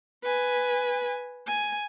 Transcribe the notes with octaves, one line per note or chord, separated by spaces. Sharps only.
B4 G#5
G#5